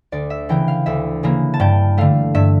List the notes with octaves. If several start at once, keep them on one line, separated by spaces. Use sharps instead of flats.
D2 D5
E5
C#3 E3 A#3 G5
F5
D2 E5
C#3 E3 A#3
A5
G2 G5
D3 A3 F5
G2 E5